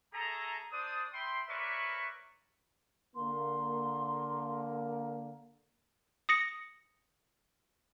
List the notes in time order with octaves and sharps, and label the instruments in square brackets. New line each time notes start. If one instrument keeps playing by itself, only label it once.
[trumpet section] A3 G#4 A4 A#5
D4 C5 D5 D#6
E5 G5 B5 C6
A#4 B4 C#5 D5 E5 C#6
[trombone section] D3 A#3 [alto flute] C6
[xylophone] D#6 A#6 C#7